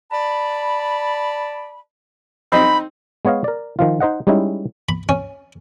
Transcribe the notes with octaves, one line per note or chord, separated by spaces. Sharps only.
D5 A5 B5
C4 D#4 B5
G#3 B3 C#5 D#5 F5
A#4 D5
D#3 F3 F4
D#4 C5 D#5 F#5
G3 G#3 C#4 D#4 E4
B5
C#4